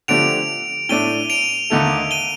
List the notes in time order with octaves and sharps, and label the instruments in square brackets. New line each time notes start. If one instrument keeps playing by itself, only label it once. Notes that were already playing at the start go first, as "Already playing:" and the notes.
[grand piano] D3 F3 A3 D4 G4 [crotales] D7 F7
[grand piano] A2 A3 D4 [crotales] D#7 G7
[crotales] D7 F7
[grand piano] D#2 D3 A3 D#4 A4
[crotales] D#7 G7